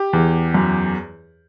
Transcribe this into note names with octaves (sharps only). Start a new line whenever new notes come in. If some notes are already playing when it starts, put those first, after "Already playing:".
Already playing: G4
E2
F#2